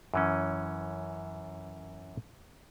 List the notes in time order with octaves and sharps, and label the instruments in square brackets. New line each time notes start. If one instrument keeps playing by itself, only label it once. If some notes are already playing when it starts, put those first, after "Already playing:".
[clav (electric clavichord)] F#2 E3 C#4